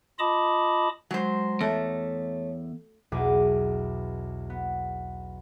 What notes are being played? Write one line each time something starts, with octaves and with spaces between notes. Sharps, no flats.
F4 D#5 A5 B5 D6 D#6
F#3 G#3 C5
E2 A3 C#5
B1 E2 B2 G#4 D6
B3